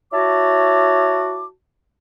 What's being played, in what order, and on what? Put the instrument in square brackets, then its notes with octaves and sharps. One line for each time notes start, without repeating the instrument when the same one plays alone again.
[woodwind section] E4 F#4 C#5 A5 D6